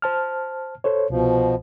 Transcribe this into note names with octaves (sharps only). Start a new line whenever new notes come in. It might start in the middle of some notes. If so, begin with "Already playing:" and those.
C5 A5 F6
A4 C5 C#5
C2 B2 F3